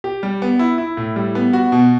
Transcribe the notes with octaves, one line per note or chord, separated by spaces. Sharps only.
G4
G3
B3
E4
E4
A2
G3
B3
F#4
B2